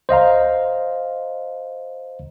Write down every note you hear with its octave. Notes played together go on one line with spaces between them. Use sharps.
C5 D#5 F5 A#5